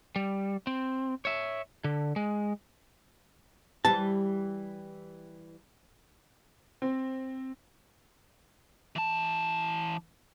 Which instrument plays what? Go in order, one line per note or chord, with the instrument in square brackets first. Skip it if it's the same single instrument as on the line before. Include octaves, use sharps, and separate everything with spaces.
[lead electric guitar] G3
C4
C#5 E5
D3
G#3
[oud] E3 G3 [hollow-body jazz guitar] A5
[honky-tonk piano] C4
[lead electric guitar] E3 A5